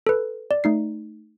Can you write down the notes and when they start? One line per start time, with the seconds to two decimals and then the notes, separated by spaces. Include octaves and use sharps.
0.07 A4 B4
0.51 D5
0.64 A3 D#4 C7